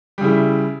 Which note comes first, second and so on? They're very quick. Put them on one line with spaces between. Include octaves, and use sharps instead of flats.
G3 C#3 E4